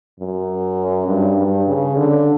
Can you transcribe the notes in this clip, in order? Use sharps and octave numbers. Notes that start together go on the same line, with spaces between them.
F#2
G2
G2
C#3
D3